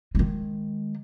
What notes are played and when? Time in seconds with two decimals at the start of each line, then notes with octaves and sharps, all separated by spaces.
0.15 D#3 G#3